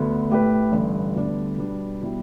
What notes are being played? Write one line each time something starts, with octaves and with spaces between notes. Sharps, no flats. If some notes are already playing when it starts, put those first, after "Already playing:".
Already playing: D2 D3 B3
A2 A3 G4 B4
A1 G2 D3
D2 D3 G3 B3 D4
B2 G3 B3 D4
B2 G3 E4 G4